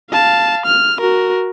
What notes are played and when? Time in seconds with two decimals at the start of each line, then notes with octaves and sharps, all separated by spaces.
0.10 F5 A5
0.66 F6
1.00 F#4 A#4